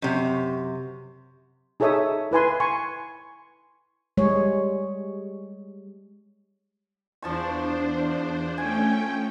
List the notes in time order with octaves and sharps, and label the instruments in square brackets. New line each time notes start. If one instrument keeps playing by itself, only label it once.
[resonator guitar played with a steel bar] F#2 C3
[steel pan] D#4 G#4 A4 C#5 E5 D#6
E4 B4 G#5 C6
G#5 C6 C#6
[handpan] G3 G#3 G#4 C#5
[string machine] E2 D4 C5 [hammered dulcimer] F3 A5 C#6
[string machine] A3 C#4 G5 [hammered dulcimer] G#5